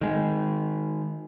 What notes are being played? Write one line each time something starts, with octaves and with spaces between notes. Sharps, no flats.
D#3 G#3